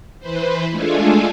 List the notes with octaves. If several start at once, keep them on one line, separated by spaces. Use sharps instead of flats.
E3 B4 C5
G#3 A3 D4 F4 G#4 A4